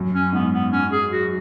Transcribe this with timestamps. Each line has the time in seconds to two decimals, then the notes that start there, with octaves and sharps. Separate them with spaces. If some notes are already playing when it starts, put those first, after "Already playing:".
Already playing: F#2
0.14 C#4
0.33 G#2 B3
0.53 B3
0.72 C#4
0.92 G#4
1.12 F#4